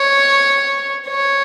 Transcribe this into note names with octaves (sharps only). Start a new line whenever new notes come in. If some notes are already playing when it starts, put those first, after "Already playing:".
Already playing: C#5
C#5